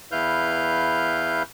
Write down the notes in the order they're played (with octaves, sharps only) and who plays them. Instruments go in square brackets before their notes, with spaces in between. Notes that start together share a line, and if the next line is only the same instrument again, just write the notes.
[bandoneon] E2 E4 B4 F5 F6 G6